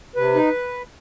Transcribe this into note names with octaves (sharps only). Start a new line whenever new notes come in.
C3 B4
D#4